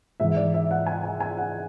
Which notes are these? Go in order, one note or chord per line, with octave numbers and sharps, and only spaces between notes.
G#2 E3 E5
D5
E5
F#5
G#5
G#5
G#5
F#5